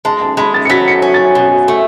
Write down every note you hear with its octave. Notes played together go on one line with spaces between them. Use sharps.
G#3 A5
A5
G#3 B5
A6
C#7
F#3 B6
C#7
B6
C#4
A6
B2
A3